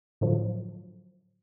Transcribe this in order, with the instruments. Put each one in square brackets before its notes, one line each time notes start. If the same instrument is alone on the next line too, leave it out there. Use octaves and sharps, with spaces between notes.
[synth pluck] A2 D3 F3 F#3